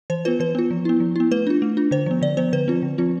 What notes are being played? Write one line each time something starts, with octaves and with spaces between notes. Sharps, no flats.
E3 C5
B3 F4 B4
E3 B4
B3 F4
F3
B3 E4
F3
B3 E4
A3 B4
D4 F4
A3
D4 F4
D3 C5
F3 B3
D3 D5
F3 B3 C5
D3 B4
F3 C4 F4
D3
F3 C4 F4